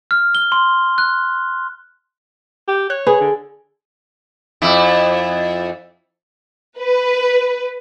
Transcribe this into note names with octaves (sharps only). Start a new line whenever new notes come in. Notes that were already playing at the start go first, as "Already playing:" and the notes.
F6
G7
C6
F#6
G4
C#5 F#6
G#4 B4
D3
F2 E4
B4